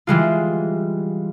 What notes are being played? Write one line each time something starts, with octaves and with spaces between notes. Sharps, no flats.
E3 G3 G#3 F4